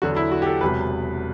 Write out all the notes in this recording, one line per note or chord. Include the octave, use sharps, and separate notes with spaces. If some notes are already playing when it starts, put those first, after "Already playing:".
E2 D3 F#3 F#4
E4
F#4
G4
A4
E1 E2 C3 F#3 B4